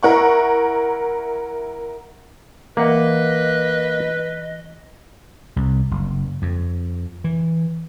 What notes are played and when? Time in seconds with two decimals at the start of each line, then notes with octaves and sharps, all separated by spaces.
0.03 E4 A#4 F#5 C#6
2.77 E3 A#3 B4 D#5 F#5
5.56 C2
5.91 F#1
6.42 F2
7.24 E3